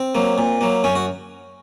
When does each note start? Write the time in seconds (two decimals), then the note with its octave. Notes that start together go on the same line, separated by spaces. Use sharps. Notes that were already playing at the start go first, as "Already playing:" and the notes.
Already playing: C4
0.15 F#3 A#3
0.38 A#2
0.61 F#3 A#3
0.84 F#2 C#4
0.95 F#4